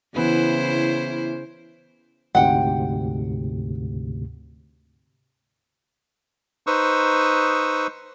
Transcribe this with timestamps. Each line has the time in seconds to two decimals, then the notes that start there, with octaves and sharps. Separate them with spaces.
0.16 C#3 E3 B3 E4 C5
2.35 D2 G#2 C3 F#5 G5
6.67 D#4 B4 C5 C#6 D#6 E6